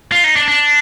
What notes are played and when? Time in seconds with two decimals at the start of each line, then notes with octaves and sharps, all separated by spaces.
0.12 F4
0.24 D#4
0.36 D4
0.48 D4